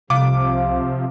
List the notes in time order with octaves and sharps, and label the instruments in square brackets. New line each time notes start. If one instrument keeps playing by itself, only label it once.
[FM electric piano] C2 F5 [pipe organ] C3 F3 [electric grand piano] D6